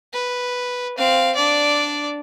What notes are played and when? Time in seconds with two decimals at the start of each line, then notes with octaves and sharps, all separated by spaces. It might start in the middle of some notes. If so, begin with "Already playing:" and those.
0.13 B4
0.98 C4 F5
1.36 D4 D5